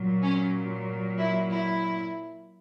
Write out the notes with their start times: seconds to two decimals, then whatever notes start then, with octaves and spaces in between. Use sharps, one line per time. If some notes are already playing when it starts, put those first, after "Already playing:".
Already playing: A#2 F#3
0.22 C#4
1.19 E4
1.51 E4